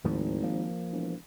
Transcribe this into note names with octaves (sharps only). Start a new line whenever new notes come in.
G#1 D#2 A2 F3
F3 A#3
E1